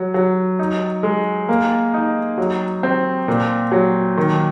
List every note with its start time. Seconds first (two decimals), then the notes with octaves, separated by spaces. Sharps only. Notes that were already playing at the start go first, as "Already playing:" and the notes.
Already playing: F#3
0.14 F#3
0.59 D#4
1.03 G#3
1.49 A#3
1.94 D#4
2.38 F#3
2.83 C4
3.28 A#2
3.72 F#3
4.17 D#3